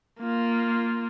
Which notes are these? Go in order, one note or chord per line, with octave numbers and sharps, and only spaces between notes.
A#3 F4